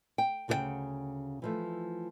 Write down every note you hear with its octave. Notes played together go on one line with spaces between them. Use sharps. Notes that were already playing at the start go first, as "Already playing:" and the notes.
G5
D2 C#3 G4 A#4 F#5 G5
E3 F3 A3